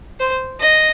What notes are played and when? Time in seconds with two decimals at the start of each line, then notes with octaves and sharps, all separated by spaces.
0.20 C5
0.60 D#5